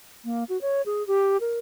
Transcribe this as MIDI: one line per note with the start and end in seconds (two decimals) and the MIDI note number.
0.25 0.44 58
0.49 0.60 66
0.61 0.82 73
0.86 1.06 68
1.07 1.37 67
1.40 1.59 70